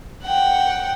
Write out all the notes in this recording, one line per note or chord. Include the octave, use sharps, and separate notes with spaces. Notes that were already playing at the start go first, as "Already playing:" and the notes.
F#5 G5